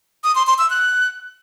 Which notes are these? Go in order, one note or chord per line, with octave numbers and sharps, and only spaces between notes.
D#6
C6
C6
E6
F#6